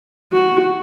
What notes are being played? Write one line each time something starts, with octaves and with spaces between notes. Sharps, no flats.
F#4